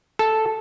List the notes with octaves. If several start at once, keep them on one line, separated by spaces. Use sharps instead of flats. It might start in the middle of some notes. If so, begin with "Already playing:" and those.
A4